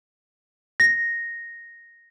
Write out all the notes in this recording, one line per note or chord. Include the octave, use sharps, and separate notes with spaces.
A#6